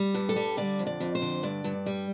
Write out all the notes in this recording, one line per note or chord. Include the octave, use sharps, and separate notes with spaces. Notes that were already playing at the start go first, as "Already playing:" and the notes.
Already playing: G3
G2
A4
G3
D3 D5
F2
D5
F2
C5
D3
G2 D5
G2
G3